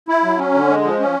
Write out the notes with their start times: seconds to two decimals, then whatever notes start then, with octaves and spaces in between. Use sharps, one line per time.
0.08 E4
0.24 F#3
0.38 C#4
0.54 D3
0.69 G#3
0.85 F3
1.00 C#4